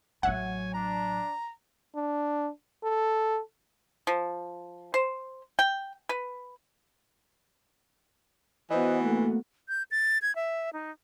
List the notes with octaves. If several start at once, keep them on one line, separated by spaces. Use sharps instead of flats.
A1 F#3 C#5 E5 F#5 G#5
D4 A#5
D4
A4
F3
C5
G5
B4
E3 B3 F#4 C5 D#5
B1 A3 A#3
G6
A6
G#6
E5
D#4